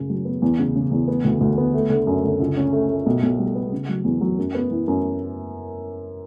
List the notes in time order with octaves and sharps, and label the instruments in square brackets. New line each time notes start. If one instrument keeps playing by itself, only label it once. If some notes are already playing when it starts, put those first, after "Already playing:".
Already playing: [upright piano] F#2 C#3
F#3
B3
E2
C#3
C#3
E2
B3
D2
D2
B3
A3
D3
F#2
D3
C#2
C#4
A3
A3
B1
B1
G3
B3
C#3
F#3
E2
F#3
F#2
B3
E3
F#2